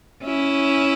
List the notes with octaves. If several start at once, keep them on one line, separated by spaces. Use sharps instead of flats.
C#4 E4